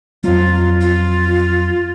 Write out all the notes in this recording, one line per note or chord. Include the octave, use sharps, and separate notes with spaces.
F2 F#3 F4
F4